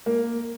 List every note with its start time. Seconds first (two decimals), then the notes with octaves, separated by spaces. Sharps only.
0.06 A#3